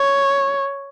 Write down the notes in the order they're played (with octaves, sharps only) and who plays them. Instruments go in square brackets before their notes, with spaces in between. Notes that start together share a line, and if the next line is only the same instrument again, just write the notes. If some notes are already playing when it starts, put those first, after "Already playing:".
Already playing: [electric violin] C#5